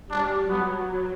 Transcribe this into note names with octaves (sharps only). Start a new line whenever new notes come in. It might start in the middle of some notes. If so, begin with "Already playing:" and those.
G3 D4
F#3 B3